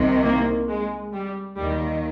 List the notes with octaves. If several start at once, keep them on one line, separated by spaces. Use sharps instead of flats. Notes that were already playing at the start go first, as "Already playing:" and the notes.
Already playing: C2 C3 D#3
A#3
G#3
G3
D#2 D#3 G3